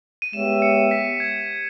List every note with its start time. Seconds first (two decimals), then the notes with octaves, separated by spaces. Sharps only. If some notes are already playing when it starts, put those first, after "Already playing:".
0.22 D#7
0.33 G#3 B3 G4 C#5 E5 E7
0.62 C#7
0.91 B6
1.20 G#6